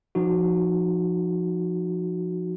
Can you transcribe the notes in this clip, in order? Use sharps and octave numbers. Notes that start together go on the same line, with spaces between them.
F3 D#4 F#4